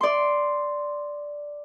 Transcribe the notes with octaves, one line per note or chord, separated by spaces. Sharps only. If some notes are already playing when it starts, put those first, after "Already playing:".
D5 C6